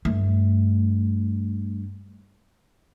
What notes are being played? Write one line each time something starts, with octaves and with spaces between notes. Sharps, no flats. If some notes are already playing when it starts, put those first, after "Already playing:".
G2 A3